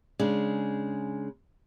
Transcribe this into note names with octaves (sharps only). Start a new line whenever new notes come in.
C#3 G#3 D4